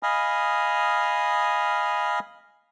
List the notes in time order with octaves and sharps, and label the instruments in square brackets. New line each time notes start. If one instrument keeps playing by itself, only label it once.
[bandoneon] D#5 F5 G#5 B5 D#6 F6